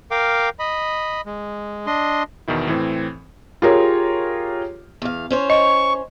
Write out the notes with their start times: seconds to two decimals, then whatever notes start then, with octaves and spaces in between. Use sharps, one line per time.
0.11 A#4 F5 G5 D6
0.59 D#5 B5
1.26 G#3
1.87 D4 D#5 C6
2.48 E2 B2 D#3 E4
2.67 A2 E3 C4
3.62 F4 G4 G#4 A#4 C#5
5.02 E2 F5
5.30 C#4 C5 C#5
5.50 D#5 C#6